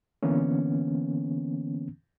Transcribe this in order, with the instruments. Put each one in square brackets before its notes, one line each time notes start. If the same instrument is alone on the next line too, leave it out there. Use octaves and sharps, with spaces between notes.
[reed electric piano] D3 E3 A#3 B3 C#4